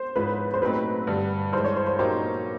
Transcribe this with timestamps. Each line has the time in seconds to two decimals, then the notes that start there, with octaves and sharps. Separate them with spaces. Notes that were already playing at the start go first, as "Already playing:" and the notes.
Already playing: C5
0.15 G#2 F3 G#3 C#4 E4 B4
0.54 C5
0.62 A#2 F#3 A3 C4 D#4 B4
1.07 G2 D3 G3
1.53 G2 E3 G#3 C5
1.64 C#5
1.76 C5
1.87 C5
1.99 A#2 F#3 A#3 D#4 G4 C5